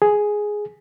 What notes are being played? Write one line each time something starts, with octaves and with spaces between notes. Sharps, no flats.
G#4